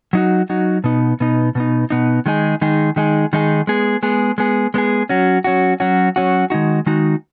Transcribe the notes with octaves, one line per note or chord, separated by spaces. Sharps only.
F#3 D#4 F#4
F#3 D#4 F#4
B2 B3 D#4
B2 B3 D#4
B2 B3 D#4
B2 B3 D#4
D#3 G#3 D#4 G#4
D#3 G#3 D#4 G#4
D#3 G#3 D#4 G#4
D#3 G#3 D#4 G#4
G#3 B3 G#4
G#3 B3 G#4
G#3 B3 G#4
G#3 B3 G#4
F#3 C#4 F#4
F#3 C#4 F#4
F#3 C#4 F#4
F#3 C#4 F#4
D#3 G#3 D#4 F#4
D#3 G#3 D#4 F#4